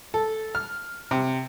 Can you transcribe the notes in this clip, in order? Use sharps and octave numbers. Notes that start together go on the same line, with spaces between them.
A4
F6
C3